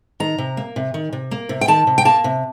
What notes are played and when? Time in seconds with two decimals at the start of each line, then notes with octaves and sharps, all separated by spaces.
0.20 D#3 A#5
0.38 C3
0.57 A#3
0.76 C3
0.94 D#3
1.13 C3
1.31 A#3
1.49 C3
1.61 G5
1.68 D#3 A5
1.87 C3
1.98 G5
2.05 A#3 A5
2.24 C3